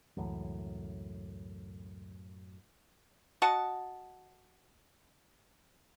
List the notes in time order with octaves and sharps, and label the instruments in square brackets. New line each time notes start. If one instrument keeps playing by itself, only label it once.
[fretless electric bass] C#2 E3 [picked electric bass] F#2 A2
[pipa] F#4 D#5 F#5 A5